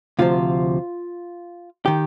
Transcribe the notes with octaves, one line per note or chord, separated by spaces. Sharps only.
D2 C3 F3 F4
D#3 G4